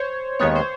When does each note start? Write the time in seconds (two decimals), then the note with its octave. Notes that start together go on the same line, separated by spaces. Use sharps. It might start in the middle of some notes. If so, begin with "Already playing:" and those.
Already playing: C5 C#5
0.39 D#2 D#3 G#3 B3 C#5
0.55 C5